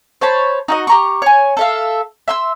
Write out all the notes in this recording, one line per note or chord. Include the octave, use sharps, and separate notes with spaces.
C5 C#5 A5 B5
D#4 F#4 D#5
G4 A#5 C#6
C#5 G#5
A4 E5 F5
E5 C6 E6